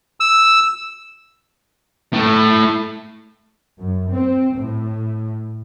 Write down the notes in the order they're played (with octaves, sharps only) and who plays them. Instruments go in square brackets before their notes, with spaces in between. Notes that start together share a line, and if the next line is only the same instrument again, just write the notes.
[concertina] E6
[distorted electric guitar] A2 A3
[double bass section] F#2
C4
A2